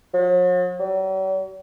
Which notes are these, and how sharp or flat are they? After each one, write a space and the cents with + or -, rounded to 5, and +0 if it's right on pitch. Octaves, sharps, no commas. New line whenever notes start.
F#3 -45
F#3 +45